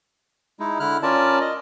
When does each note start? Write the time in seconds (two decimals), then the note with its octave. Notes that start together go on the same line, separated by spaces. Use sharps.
0.60 G#3 D#4 E4
0.80 D3 E4 F6 F#6
1.03 C#4 F4 A#4 D5 A5
1.41 D#5